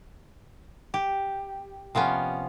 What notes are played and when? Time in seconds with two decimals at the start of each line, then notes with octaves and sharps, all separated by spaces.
0.94 G4
1.95 C3 F3 B3 C#4